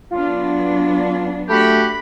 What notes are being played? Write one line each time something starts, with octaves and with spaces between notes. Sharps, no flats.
F#3 B3 D4 F4
A3 F#4 G4 B5